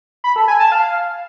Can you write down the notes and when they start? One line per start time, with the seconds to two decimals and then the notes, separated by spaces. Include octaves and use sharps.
0.24 B5
0.36 A4
0.48 G#5
0.60 A5
0.72 F5